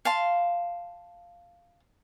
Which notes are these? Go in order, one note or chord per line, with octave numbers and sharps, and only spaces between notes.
F5 A5 C6